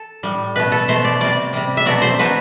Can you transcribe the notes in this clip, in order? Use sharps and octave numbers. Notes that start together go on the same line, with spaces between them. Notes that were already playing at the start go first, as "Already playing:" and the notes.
Already playing: A4
A2 G3
B2 A3 B4
A4
B2 A3 C5
D5
C3 G3 D5
C3 G3
E5
B2 F#3 A3 D5
C5
B2 F#3 A3 B4